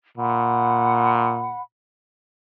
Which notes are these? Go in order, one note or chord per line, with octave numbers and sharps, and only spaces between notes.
A#2 F#5 B5